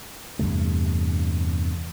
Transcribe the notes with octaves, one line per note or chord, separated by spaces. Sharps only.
E2 G2 C3 A3